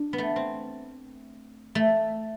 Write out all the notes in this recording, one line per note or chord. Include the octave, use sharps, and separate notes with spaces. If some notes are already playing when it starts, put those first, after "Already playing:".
Already playing: D4
B3
A3
C4
A3